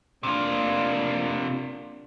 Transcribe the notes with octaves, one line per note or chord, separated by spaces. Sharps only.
C3 A#3 D4 F4